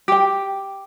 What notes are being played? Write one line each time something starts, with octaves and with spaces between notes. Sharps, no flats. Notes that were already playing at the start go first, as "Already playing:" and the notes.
G4 G5